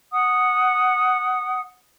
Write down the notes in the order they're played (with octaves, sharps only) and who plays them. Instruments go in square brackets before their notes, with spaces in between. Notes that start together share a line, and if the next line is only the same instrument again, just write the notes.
[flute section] F#5 D#6